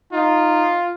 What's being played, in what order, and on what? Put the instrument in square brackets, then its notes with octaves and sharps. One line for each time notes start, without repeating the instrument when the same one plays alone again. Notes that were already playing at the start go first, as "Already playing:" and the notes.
[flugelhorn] D#4 [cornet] F4